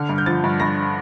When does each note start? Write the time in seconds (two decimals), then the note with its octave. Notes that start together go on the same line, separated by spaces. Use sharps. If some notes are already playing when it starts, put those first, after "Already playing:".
Already playing: D3 F6
0.09 G2
0.18 G6
0.26 F3 A6
0.44 G2
0.60 G2 A#6